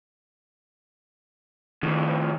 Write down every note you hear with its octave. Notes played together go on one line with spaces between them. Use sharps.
F2 A2 D#3